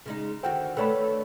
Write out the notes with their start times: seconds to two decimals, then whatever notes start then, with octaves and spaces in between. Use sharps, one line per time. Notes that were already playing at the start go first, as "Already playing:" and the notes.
0.06 C#3 G#3 D#4
0.43 D3 D#3 F#4 C5 F#5 G5
0.77 A3 D4 A4 B4 C#5 B5